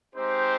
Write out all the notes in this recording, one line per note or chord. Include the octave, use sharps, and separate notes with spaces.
G#3 C4 D#4 G4 C5